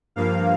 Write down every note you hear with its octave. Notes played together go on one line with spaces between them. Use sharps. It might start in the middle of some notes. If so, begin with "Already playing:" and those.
G2 F3 A#3 F5